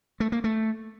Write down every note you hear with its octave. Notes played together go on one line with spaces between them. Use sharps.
A3
A#3
A3